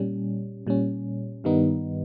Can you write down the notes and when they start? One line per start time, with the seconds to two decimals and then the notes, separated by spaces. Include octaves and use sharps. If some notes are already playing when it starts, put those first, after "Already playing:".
Already playing: A#2 G3 C#4
0.67 A#2 G3 C#4
1.44 G2 D#3 G3 B3 D#4